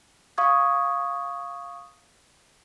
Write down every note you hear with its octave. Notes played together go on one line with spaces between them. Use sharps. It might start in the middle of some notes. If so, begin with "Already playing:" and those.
F5 C#6 D#6 G#6